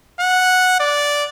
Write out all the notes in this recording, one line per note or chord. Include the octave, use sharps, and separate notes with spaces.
F#5
D5